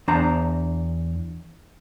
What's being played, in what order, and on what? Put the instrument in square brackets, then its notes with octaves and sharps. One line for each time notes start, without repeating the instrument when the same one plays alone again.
[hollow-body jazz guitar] E2 D4 C5 A5 A#5